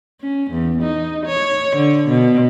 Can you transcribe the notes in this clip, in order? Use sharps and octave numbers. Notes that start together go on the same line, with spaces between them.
C#4
E2
D#4
C#5
D3
B2